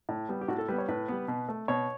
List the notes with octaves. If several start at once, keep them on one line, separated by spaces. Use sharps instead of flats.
A2
G3 B3
G4
A2 F#4
A4
G3 B3 B4
C#5
A2 B4
G3 B3
B2
A3
B2 C#5